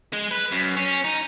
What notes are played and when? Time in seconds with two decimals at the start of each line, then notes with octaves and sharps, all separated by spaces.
0.13 G#3
0.31 B4
0.52 F#2
0.77 C#4
1.04 D#4